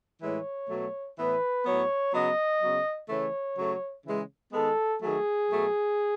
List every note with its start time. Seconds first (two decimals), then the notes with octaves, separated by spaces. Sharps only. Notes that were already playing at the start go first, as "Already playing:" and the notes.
0.22 A2 E3 G#3 C#5
0.69 B2 F#3 A3
1.17 A2 E3 B3 B4
1.65 A2 F#3 B3 C#5
2.13 C#3 F#3 B3 D#5
2.61 C#3 F#3 B3
3.09 C#3 E3 A3 C#5
3.56 C#3 F#3 A3
4.05 C#3 E3 G#3
4.52 D#3 G#3 B3 A4
5.01 D#3 F#3 A3 G#4
5.48 B2 F#3 A3